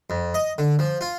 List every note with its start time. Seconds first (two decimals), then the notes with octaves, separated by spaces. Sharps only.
0.10 F2
0.34 D#5
0.58 D3
0.79 F3
1.01 F4